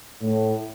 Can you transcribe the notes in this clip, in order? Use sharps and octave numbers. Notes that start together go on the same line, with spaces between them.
A2